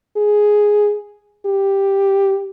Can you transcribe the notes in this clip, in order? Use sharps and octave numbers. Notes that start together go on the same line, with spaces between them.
G#4
G4